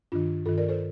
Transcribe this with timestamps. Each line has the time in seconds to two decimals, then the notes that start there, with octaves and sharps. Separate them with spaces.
0.12 G2 D#3 D4 F4
0.46 G2 D#3 F4 A4
0.58 A#4 D5
0.68 A4 C5